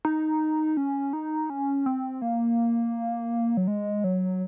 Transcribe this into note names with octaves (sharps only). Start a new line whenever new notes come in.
D#4
C#4
D#4
C#4
C4
A#3
F#3
G#3
F#3